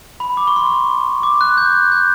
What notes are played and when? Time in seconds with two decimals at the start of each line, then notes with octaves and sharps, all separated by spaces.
0.20 B5
0.37 D6
0.47 C#6
0.56 C6
0.67 C#6
1.23 D6
1.41 F#6
1.58 G6
1.92 G6